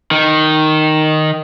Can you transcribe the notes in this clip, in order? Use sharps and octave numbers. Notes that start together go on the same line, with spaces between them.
D#3